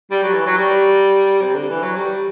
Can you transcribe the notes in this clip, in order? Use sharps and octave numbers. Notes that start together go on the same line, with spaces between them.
G3
F#3
E3
F#3
G3
C3
D3
E3
F#3
G3